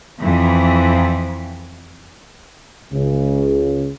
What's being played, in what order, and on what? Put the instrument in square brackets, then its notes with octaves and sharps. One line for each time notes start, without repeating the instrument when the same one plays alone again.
[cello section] F2 E3
[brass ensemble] C#2 C#3